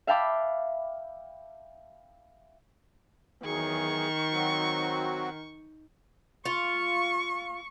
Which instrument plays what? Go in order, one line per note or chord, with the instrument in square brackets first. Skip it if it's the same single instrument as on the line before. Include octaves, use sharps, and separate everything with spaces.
[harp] E5 F5 G5 A5 B5 D6
[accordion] E2 F#3 G#4 [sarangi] D#3 [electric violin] C#6
[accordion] F#3 C4 F#4
[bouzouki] F4 [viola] C#6